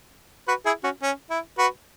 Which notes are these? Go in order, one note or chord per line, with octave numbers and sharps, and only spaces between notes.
F#4 B4
E4 G#4
C#4 F#4
C#4
E4
F#4 B4